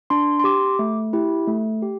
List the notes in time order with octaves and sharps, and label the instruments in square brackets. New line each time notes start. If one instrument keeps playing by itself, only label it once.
[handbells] D4 C6
C6
G4 D6
A3
E4 G4
A3
G4